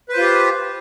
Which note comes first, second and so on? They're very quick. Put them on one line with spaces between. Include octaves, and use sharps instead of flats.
B4 C5 F4 G4